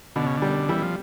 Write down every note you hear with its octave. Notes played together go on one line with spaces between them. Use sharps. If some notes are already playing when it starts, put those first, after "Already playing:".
B2 D3
C#3
D3
G3
E3 G3
F3